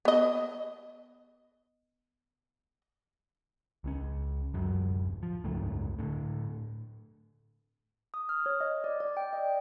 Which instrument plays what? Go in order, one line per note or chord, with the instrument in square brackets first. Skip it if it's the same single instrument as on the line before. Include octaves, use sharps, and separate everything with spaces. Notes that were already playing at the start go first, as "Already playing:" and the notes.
[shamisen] B3 D#5
[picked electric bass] C#2 C4 C#4
D1 F#2 F#3
F3
F#1 C#2 G#2 A3
A2 D3
[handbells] D#6
F6
C#5
D#5
D5
D5
G5
D#5